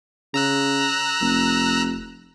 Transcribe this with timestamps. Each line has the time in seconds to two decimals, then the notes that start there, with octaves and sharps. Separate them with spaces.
0.34 C#3 A#5 E6 F#6
1.21 F1